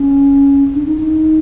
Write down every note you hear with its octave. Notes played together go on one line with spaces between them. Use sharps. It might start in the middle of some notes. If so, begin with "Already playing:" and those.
Already playing: C#4
D4
D#4
D#4